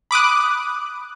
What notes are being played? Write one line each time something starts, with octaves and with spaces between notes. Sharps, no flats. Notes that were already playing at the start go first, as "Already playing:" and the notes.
B5 D6 D#6 F#6